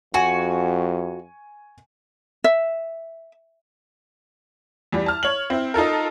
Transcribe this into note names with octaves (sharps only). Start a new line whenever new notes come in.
F2 F#4 G#5 C#6
E5
E2 G3
A5 F6
C#5 F#7
C4 E4
D#4 F4 A4 A#4